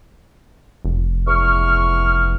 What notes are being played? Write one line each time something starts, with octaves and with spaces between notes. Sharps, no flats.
F1
E2 C#6 F6